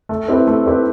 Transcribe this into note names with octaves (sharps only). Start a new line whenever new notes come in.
A3
C4 E4 G4 B4
A3
C4 E4 G4 B4